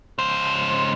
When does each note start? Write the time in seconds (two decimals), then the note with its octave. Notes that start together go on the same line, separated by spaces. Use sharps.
0.19 C#2 C5